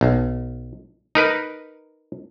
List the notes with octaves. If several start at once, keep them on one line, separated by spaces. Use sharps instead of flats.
B1
D#4 A#4 B4